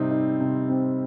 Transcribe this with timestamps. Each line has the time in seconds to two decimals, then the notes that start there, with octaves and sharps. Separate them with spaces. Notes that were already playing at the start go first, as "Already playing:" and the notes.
Already playing: C3 G3 C4 D#4
0.11 D#4
0.41 C3
0.69 C4